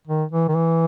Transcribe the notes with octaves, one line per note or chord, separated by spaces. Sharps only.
D#3
E3
D#3
E3